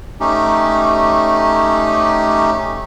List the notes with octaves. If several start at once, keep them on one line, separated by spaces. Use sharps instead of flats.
A3 C#4 D#4 G4